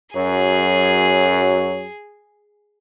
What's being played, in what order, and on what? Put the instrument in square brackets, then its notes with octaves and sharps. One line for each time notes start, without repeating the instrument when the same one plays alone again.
[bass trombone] F#2 [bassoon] F#3 [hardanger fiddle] G#4